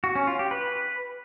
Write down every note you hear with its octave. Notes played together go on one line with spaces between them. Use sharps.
F#4
C#4
F4
G4
B4